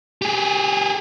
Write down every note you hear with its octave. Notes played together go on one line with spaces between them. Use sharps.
G4 G#4